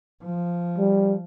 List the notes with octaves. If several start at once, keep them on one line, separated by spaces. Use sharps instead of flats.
F3
G3